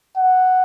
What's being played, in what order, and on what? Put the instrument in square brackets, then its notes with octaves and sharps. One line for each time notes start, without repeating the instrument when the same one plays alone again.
[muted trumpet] F#5